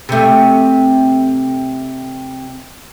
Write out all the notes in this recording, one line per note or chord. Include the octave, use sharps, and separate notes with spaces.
C3 A3